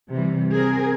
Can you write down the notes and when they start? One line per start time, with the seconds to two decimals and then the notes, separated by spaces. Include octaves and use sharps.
0.11 C3 E3 G3
0.52 C4 G#4 A#4